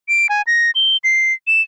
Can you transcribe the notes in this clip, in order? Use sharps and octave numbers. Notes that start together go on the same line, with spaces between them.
D7
G#5
A#6
G7
C7
E7